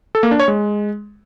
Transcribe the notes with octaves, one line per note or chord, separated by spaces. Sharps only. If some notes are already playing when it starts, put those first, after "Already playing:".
A4
A#3
D4
C#5
G#3